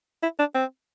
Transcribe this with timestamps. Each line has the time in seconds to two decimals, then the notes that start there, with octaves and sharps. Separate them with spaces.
0.23 E4
0.39 D4
0.55 C4